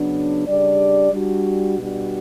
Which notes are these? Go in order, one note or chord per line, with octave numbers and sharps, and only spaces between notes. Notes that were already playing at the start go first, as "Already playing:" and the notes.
Already playing: C#3 F#3 B3 D4
C#3 G3 D4 G4 D5
G3 D4 F#4
B2 G3 D4 F#4